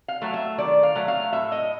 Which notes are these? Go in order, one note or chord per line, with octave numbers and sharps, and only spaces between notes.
F5
F#3 A3
E5
D#3 D5
F5
F#3 A3
F5
A2 E5
D#5